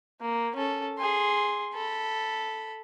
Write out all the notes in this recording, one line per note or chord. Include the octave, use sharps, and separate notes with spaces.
A#3
C#4 A4
G#4 C6
A4 B5